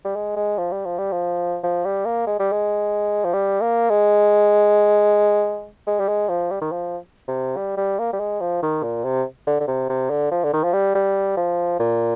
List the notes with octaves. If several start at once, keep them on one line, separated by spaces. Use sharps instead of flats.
G3
G#3
G#3
F3
G3
F3
G3
F3
F3
G3
A#3
G#3
G3
G#3
F3
G3
A#3
G#3
G#3
G3
G#3
F3
G3
D#3
F3
C3
G3
G3
A#3
G3
G#3
F3
D#3
A#2
C3
D3
D3
C3
C3
D3
F3
D3
D#3
F3
G3
G3
F3
A#2